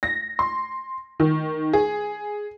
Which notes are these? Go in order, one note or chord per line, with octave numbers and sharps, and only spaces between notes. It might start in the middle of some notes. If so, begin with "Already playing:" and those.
A#6
C6
D#3
G#4